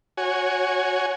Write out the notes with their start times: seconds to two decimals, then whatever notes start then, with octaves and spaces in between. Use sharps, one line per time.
0.17 F#4 C#5 G#5